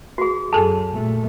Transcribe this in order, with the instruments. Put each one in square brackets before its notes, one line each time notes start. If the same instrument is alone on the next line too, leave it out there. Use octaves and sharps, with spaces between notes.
[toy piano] F#4 G#4
[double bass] F#2 [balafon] G#4 A4 G#5 [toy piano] A5
[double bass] A#2 A3